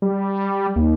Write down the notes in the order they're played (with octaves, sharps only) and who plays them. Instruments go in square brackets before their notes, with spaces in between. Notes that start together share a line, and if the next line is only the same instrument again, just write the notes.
[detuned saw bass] G3
D#2